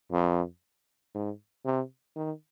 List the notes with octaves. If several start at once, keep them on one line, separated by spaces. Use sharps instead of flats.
F2
G#2
C3
D#3